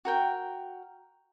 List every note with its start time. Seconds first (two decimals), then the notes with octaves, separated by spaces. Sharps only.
0.05 F#4 A#4 G5